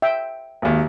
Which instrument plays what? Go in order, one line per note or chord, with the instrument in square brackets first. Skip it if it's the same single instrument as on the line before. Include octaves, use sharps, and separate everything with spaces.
[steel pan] E5 G5
[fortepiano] G#1 D#2